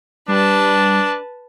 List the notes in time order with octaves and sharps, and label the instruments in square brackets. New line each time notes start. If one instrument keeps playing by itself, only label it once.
[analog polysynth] G3 [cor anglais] D4 [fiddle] B4 A5